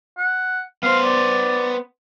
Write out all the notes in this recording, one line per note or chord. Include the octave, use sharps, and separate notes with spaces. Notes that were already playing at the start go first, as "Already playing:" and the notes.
F#5
B3 C5 F5
D5